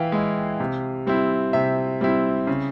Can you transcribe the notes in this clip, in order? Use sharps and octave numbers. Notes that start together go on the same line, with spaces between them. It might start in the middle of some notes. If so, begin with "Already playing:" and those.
Already playing: E3 E4 F5 G5
G#3 E4
C3
G3 C4 E4
C3 E5
G3 C4 E4
C#3